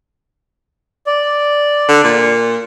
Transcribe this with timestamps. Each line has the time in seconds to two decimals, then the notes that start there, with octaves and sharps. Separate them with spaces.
1.06 D5
1.88 D3
2.04 A#2